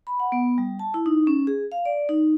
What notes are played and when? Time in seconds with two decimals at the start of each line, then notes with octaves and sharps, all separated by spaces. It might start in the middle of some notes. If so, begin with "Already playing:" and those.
0.07 B5
0.20 F#5
0.32 B3
0.58 G3
0.79 A5
0.94 E4
1.06 D#4
1.27 C#4
1.47 G#4
1.72 F5
1.85 D5
2.09 D#4